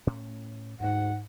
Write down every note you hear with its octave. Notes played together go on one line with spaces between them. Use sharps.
A2 C#4
D2 G#2 G#3 F#5